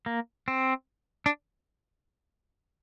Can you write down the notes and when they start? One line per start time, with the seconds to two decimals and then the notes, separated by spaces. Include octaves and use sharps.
0.06 A#3
0.48 C4
1.26 D4